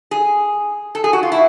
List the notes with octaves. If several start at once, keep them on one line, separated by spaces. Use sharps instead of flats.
G#4
A4
G#4
F#4
F4
E4